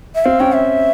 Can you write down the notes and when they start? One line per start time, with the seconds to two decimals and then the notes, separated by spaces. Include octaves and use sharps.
0.15 E5
0.25 C4 F5
0.40 C#4 G5
0.54 E5